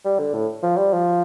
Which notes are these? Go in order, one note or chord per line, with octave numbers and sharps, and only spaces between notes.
G3
D3
A2
F3
G3
F3